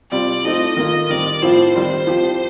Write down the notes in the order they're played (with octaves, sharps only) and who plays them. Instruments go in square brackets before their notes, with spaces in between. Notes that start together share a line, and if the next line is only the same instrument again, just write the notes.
[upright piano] C3 G3 C4 F4 [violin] D5
[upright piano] F3 A3 C4 D#4 [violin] D#5
[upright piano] D#3 A#3 F4
[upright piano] D#3 G3 C4 [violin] D5
[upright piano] A2 F3 C4 F4 [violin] C5
[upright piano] D#3 G3 C4
F3 C4 G4